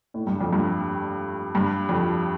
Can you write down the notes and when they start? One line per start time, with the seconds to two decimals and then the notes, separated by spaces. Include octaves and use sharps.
0.14 A2
0.27 G2
0.41 F2
0.53 G2
1.55 G2
1.89 F2